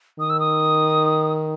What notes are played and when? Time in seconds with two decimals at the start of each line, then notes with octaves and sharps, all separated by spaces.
0.19 D#3 D#6
0.30 E6
0.40 D#6